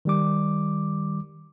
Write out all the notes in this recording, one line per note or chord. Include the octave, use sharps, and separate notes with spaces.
D#3 G3 D6